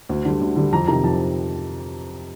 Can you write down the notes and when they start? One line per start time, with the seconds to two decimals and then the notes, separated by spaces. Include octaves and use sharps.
0.09 D2
0.25 D3 G3
0.41 D2
0.56 D3 G3
0.73 F2 A#5
0.88 C3 D#3 A#5
1.03 F2 A5